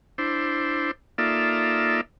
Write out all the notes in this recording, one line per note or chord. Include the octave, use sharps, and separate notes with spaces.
D4 E4 C5
A#3 D#4 F4 A4 D5 E5